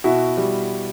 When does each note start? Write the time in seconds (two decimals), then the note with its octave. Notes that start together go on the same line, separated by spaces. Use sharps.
0.04 B2 E4 F#4
0.37 G3